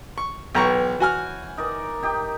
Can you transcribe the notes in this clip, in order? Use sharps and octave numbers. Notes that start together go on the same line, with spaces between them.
C#6
B1 E3 C#5 G5 A#5 C#6
F#4 G#5 F6
D#4 A#4 D5
D#4 G4